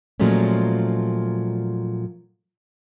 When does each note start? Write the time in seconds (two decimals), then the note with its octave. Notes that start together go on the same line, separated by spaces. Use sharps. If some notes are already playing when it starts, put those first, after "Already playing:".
0.20 A#2 F3 F#3 G#3 A3 C#4